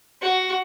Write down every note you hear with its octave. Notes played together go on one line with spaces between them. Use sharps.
F#4